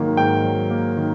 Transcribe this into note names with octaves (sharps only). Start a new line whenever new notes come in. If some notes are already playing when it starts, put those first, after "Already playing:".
Already playing: G#2 D#3 F#3 A#3
G#2 G5
F#3
A#3
D#3